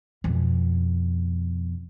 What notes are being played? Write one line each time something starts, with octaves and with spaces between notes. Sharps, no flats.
F2 B2